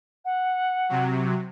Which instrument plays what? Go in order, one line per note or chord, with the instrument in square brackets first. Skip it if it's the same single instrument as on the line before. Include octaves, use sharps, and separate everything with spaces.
[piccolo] F#5
[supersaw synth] C3 F#3